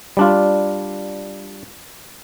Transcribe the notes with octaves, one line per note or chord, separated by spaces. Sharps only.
G3 D4 F4